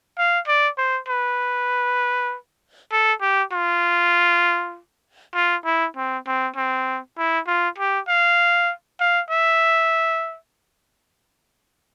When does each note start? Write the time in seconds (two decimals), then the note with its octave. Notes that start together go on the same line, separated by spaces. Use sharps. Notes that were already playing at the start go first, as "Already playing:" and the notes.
0.18 F5
0.47 D5
0.78 C5
1.08 B4
2.92 A4
3.21 G4
3.52 F4
5.35 F4
5.65 E4
5.96 C4
6.27 C4
6.56 C4
7.18 E4
7.47 F4
7.78 G4
8.08 F5
9.00 F5
9.30 E5